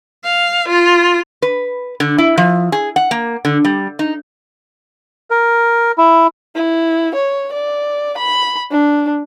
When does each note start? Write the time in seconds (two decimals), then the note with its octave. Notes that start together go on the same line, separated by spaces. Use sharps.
0.24 F5
0.69 F4
1.42 B4
2.00 D3
2.18 E4
2.38 F3
2.72 G#4
2.96 F#5
3.11 A#3
3.45 D3
3.65 G3
3.99 D#4
5.30 A#4
5.98 E4
6.55 E4
7.15 C#5
7.53 D5
8.18 B5
8.71 D4